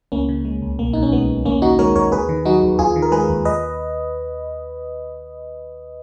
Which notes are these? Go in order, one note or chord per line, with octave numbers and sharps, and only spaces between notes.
C#2 A#3 C#4
C#3
G#3
C#2
B1 A#3
B2 D#4
C#4
G#3 B3
B1
D#2 A#3 C#4
D#3 D#4 F#4
G#3 A#4 C#5
D#2 A#4 C#5
D#2 G#4 B4
D#3
F#3 D#4 F#4
D#2
D#2 F4 G#4
D#3
A#4
G#3 G#4 B4
D#2
D#2 B4 D#5